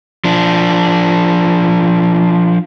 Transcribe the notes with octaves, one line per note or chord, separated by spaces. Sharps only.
F3 D4